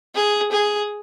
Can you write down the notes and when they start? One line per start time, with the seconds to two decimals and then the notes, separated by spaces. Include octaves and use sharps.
0.15 G#4
0.52 G#4